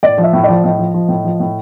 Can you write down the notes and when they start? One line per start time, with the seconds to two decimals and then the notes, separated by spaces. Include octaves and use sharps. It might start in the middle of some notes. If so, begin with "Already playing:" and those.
0.03 A2 D5
0.18 F3
0.23 E5
0.33 A2
0.43 D5
0.49 F3
0.64 A2 D#5
0.78 F3
0.94 F3
1.09 A2
1.24 F3
1.40 A2